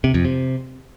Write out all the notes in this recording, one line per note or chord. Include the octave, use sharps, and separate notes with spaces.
C3
F2
C3